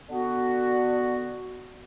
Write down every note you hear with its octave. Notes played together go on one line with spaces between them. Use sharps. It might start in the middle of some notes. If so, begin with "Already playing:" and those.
D3 B3 F#4